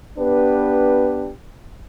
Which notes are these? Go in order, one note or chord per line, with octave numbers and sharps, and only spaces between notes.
B3 D4 G4 B4